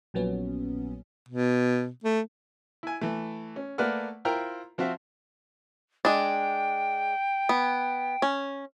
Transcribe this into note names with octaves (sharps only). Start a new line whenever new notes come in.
A#1 A#2 F#3 B3 C#4
B2
A3
E4 G#5
E3 A3
C#4
A3 A#3 B4 D5 F#5 F6
E4 F4 A#4 C5 G5 A#5
F3 C4 F#4 E5 F5
G#3 D4 G5
B3
C#4